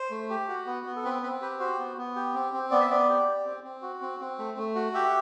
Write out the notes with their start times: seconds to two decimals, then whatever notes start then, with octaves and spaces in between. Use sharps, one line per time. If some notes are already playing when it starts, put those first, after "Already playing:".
Already playing: C5
0.11 A3
0.30 G4
0.48 F#4
0.67 B3
0.86 B3
0.96 A4
1.04 C4 B4
1.22 C4 B4
1.42 G4 B4
1.60 F#4 C5
1.79 B3
1.97 B3
2.16 G4
2.34 C4
2.53 C4
2.71 B3 D5
2.81 E5
2.90 B3 D5
3.09 G4
3.28 G4
3.45 C4
3.64 C4
3.82 F#4
4.01 C4
4.20 C4
4.39 A3
4.58 A3
4.75 F#4
4.94 G4 E5